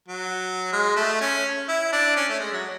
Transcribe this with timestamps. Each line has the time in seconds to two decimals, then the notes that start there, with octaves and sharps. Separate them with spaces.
0.08 F#3
0.73 G#3
0.96 A3
1.21 C#4
1.68 E4
1.92 D4
2.16 C#4
2.29 A3
2.40 G#3
2.52 F#3